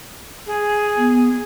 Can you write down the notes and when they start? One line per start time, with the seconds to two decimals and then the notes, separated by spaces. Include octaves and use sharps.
0.46 G#4
0.97 B3